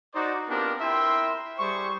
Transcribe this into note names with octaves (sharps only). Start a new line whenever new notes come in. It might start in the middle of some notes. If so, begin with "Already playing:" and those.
D#4 F#4 C5 D5
B3 C4 D4 F4 G4 A#4
E4 A#4 E5 G5 C6
G3 G#4 C5 C#6